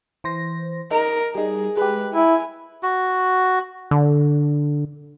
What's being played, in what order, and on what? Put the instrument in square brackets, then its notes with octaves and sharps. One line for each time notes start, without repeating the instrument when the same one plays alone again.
[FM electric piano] E3 C5 A#6
[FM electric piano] D#4 [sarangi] A#4
[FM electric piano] G3 D#4 [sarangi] G#4
[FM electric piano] G#3 G4 [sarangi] B4
[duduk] E4 [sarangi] G#5
[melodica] F#4
[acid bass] D3